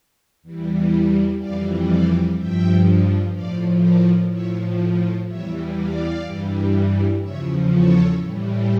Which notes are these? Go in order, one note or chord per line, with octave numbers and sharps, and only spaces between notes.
E2 E3 G3
F2 E3 G3 D5 F5
D5 F5
G2 F3 E5 G5
A2 F3 D5 F5
A#4 D5
A2 F3 C#5 E5
E2 E3 G3 C#5 E5
D5 F5
G2 E3 G3
E2 C#3 F3 C#5 E5
A4 C#5
A2 E3 G3